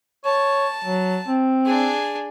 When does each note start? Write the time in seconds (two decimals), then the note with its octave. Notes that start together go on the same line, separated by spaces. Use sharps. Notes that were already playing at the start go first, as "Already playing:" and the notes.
0.25 C#5 A5
0.85 F#3
1.28 C4
1.65 D4 G#4